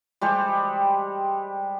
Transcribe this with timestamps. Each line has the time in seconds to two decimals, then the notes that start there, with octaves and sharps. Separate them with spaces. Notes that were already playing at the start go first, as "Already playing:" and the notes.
0.21 G3 G#3 G4 C5